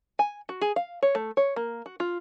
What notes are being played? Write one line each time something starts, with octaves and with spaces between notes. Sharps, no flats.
G#5
F#4
G#4
F5
C#5
A3
C#5
A#3
F#4
F4